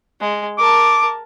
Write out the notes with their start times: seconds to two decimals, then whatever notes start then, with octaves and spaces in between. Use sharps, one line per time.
0.21 G#3
0.58 A#4 A5 D6